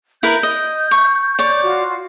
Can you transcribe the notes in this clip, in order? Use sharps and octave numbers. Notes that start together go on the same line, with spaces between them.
E4 A#4 B4 G6
D#5
C#6
C#5 D5
F4 F#4